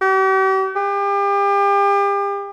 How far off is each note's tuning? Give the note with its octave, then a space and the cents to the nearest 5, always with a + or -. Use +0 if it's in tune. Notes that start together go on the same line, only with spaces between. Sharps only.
G4 -45
G4 +35